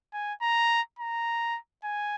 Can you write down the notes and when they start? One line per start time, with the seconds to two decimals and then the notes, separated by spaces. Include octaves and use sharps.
0.13 G#5
0.42 A#5
0.99 A#5
1.84 G#5